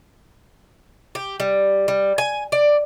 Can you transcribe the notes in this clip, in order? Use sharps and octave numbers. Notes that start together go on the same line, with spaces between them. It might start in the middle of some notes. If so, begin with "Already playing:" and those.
G4
G3
G3
G#5
D5